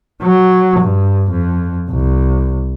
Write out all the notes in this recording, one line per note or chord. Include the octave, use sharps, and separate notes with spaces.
F#3
G2
F2
C2